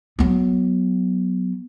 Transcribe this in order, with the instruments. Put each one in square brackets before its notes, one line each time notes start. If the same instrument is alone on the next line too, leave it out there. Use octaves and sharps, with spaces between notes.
[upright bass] F#3 B3